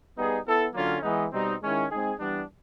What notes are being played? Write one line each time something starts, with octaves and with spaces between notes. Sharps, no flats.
G3 B3 D#4 G#4
B3 E4 A4
D3 F#3 A#3 C#4 F4
E3 G#3 B3 D#4
B2 G3 C4 D#4
D#3 G#3 C#4 E4
G#3 C4 D#4 G#4
E3 G3 B3 D4